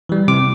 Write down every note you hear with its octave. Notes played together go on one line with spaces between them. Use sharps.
E3 G3
C3 D6